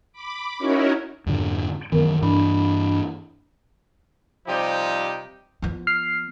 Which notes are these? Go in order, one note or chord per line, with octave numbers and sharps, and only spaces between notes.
B5 D6
C#4 D#4 E4 F#4 A#4 C#5
F2 G#2 D3
F#2 D#3 E3 B3 A#4
G2 E3 D4 B5
C3 F3 G3 D#4 G4
F3 B3
F6 C7